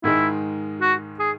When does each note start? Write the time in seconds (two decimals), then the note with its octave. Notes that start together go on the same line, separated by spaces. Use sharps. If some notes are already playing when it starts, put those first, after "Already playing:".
0.04 G#2 D#3 G#3 E4
0.81 F#4
1.19 G#4